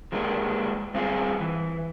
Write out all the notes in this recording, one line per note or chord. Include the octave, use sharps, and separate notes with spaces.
F3 G#3 A#3 D4 G4
G2 C4 F4 G#4
E3